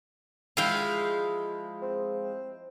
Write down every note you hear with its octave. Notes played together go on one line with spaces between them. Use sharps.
F3 G#3 E4 F5 G5
C4